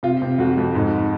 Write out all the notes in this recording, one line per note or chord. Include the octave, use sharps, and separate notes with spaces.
C3 F4
C3
F2 F#4
F2
G#2